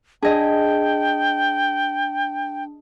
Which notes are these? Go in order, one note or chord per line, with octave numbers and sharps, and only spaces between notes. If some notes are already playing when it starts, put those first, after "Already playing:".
D4 G#4 D#5 G5 A5